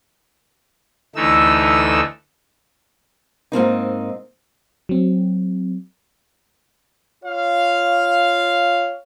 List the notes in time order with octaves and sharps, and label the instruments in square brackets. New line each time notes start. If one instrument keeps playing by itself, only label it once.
[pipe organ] D2 E3 A3 D#4 E6
[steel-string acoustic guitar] G#2 A#3 C4 D#4
[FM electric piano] F#3 C4
[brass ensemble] F4 C#5 F5